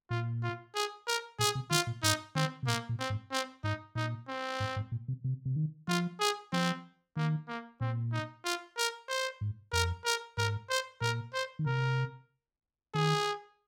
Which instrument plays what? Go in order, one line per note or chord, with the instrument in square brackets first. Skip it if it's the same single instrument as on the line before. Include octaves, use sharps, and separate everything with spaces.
[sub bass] A#2 [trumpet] F4
[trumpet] F4
G#4
A#4
[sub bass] A#2 [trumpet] G#4
[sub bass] C3
[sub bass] D#3 [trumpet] F4
[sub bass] A#2
[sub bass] G#2 [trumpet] D#4
[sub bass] D#3 [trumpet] C4
[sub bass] C3
[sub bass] A#2 [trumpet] A#3
[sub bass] A#2
[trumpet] C4
[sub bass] G#2
[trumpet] C4
[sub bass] G#2 [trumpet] D#4
[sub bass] A#2 [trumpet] D#4
[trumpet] C4
[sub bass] G#2
G#2
A#2
C3
C3
C3
D#3
[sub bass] F3 [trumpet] F4
[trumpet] G#4
[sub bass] F3 [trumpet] C4
[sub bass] D#3 [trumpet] A#3
[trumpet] A#3
[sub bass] A#2 [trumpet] C4
[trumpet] D#4
F4
A#4
C5
[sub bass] G#2
[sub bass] F2 [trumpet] A#4
[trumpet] A#4
[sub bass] G#2 [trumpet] A#4
[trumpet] C5
[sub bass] A#2 [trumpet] A#4
[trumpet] C5
[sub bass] D#3
[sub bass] C3 [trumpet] A#4
[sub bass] D#3 [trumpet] G#4